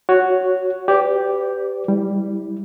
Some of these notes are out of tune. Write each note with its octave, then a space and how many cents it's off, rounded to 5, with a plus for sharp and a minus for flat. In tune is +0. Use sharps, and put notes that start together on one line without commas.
F#4 +0 C#5 +5
G4 +0 B4 +35 D5 -25
G3 +5 E4 -20